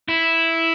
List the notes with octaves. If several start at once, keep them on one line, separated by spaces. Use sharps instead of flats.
E4